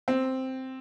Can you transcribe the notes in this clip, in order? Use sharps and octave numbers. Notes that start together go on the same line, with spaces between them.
C4